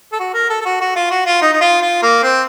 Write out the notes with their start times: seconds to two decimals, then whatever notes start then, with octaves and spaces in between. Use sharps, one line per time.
0.12 A4
0.19 F#4
0.33 A#4
0.49 A4
0.61 A4
0.65 F#4
0.80 F#4
0.95 F4
1.10 F#4
1.26 F4
1.41 D#4
1.52 D#4
1.61 F4
1.82 F4
2.02 A#3
2.23 C4